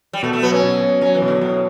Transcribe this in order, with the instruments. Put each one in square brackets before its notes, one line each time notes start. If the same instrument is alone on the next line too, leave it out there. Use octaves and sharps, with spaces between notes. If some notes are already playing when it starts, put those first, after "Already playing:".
[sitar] G3
[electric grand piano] B2 [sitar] A3
[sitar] A3
[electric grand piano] F#3 [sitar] B3
[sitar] C#4
[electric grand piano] B2
B2
[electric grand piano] F#3 [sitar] C#4
[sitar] E3
[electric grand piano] B2
[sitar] D3
[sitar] A2 [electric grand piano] F#3